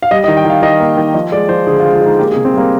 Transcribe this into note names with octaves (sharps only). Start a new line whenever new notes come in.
F5
G3 D#5
D#5
D#3
G5
D#3 F5
D#3 D#5
A#3
D#3
F3 D#5
G#3 D5
F3 C5
D3 G#4
F4
G#3
F4
G#3 D#4
A#3 G4
G#4
C3
C4
G3 A#3